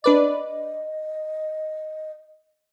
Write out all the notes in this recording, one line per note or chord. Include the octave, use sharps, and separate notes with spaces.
D4 B4 D5 D#5